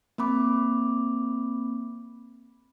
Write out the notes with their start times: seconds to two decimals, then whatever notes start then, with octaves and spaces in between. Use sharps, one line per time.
0.18 A#3 C4 B5 D6